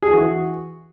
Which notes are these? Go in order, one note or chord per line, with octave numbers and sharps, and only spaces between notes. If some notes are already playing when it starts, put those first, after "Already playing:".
G#4
E3 F#4